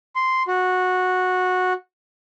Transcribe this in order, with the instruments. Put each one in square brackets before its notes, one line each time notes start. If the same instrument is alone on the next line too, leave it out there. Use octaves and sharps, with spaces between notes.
[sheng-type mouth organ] C6
F#4